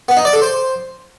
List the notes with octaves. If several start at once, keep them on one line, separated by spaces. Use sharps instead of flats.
B3
D#4
D5
A4
C5